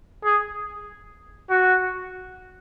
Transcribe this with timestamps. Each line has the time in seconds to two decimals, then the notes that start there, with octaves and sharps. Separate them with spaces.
0.24 G#4
1.50 F#4